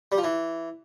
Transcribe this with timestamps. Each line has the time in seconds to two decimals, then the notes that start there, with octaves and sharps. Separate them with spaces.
0.12 G3
0.18 F3
0.24 E3